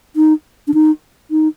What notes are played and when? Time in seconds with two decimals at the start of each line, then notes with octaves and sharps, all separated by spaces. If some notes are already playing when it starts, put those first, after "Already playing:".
0.16 D#4
0.68 D4
0.74 D#4
1.31 D#4